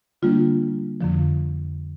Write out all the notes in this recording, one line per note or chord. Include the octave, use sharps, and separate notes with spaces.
D3 G3 A#3 D4 F4
F2 D3 F3